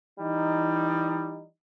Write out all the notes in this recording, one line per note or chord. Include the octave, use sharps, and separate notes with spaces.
E3 G3 D#4